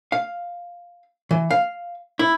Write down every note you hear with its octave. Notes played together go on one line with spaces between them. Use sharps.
F5
E3
F5
E4